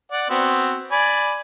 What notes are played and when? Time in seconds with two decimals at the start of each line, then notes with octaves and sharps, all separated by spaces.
0.12 D5 F#5
0.30 B3 C4 F#4
0.92 D5 G#5 B5